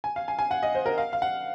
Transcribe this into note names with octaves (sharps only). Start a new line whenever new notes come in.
G#5
F5
G#5
G#5
F#5
D#5
C5
A#4
F5
F5
F#5